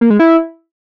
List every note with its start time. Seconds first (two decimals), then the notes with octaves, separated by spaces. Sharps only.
0.01 A#3
0.10 G#3
0.19 E4